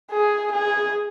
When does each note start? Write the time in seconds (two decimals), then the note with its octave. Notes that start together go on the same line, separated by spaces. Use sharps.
0.11 G#4
0.52 G#4